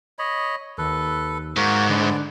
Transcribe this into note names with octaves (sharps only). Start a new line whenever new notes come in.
C#5 D#5 B5
D#2 A4 B4
G#2 A#3 F#4
D3 G#3 B4 D5